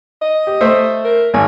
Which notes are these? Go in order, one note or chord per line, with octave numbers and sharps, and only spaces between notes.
D#5
G4
A3 C5 E5
A#4
G#1 G#5